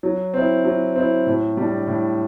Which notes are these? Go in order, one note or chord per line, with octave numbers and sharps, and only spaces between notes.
F#3
C4 E4
F#3
C4 E4
A2
G3 D4
A2